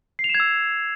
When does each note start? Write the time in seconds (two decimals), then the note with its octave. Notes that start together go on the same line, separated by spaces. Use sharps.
0.19 C7
0.24 F7
0.29 E7
0.35 G#6
0.40 E6